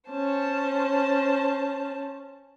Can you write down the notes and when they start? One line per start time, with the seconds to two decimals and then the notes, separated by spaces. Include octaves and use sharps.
0.10 C#4 C5 A5